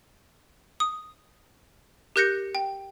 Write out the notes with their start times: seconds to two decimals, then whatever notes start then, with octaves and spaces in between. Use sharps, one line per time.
0.80 D#6
2.16 G4 A#4 F#6 G6 A#6 C#7
2.55 G5